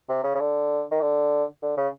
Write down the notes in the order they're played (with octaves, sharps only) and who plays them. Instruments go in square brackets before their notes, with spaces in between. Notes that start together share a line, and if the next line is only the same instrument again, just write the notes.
[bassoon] C3
C#3
C#3
D3
D#3
D3
D3
C#3